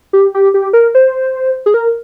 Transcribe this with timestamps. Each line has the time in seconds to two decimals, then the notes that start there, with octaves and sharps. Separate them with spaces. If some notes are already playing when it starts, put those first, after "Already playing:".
0.13 G4
0.34 G4
0.54 G4
0.73 A#4
0.95 C5
1.66 G#4
1.74 A#4